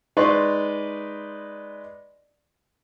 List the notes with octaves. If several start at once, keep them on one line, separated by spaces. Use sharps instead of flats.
G#3 D#4 B4 D5 C6 C#6